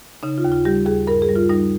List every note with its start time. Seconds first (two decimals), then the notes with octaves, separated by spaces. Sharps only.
0.23 C#3 D#4
0.38 F4
0.44 D#2
0.52 F4
0.65 G3 G4
0.86 D#2 G#4
1.07 G2 A#4
1.22 G#4
1.29 G3
1.36 F4
1.49 G3 D#4